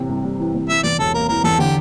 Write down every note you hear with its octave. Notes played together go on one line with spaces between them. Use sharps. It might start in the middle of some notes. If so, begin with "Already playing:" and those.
Already playing: A2 C3 E3
C2
G3
E3
C3
E3 E5
E2 D5
E1 A4
A#3 A#4
E3 A#4
E2 A4
D3 G4